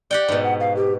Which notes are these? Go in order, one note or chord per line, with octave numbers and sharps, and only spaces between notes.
G4 D5 F#5 G5
G#2 B2
F#5
F5
G4